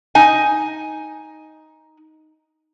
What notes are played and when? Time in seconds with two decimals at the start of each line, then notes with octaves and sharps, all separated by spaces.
0.15 D#4 G#5